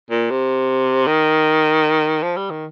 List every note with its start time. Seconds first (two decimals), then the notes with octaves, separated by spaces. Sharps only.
0.10 A#2
0.30 C3
1.07 D#3
2.22 F3
2.36 G3
2.50 D#3